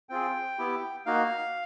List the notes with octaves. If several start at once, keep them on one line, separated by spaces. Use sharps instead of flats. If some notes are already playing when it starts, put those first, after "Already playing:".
C4 F4 G#4 G5
B3 E4 G4
A#3 D#4 F#4 F5